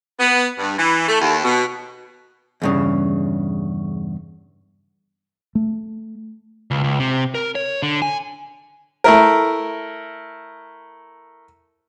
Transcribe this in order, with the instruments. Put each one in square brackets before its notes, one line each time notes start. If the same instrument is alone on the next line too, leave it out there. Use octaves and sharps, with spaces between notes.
[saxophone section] B3
G2
E3
A3
D#2
B2
[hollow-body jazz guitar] E2 G2 C#3
[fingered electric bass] A3
[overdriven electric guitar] C#2
C#2
C3
A#4
C#5
D3
G#5
[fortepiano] A3 E4 A#4